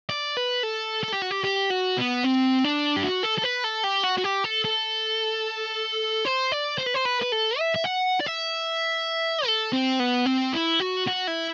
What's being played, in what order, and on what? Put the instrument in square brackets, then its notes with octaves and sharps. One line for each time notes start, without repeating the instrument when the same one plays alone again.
[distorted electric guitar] D5
B4
A4
A4
G4
F#4
G4
G4
F#4
B3
C4
D4
G4
F#4
A4
A4
B4
A4
G4
F#4
F#4
G4
A4
A4
C5
D5
C5
B4
C5
B4
B4
A4
E5
E5
F#5
D5
E5
A4
C4
B3
C4
E4
F#4
F#4
E4